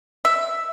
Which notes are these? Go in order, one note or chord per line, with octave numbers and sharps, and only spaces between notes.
E5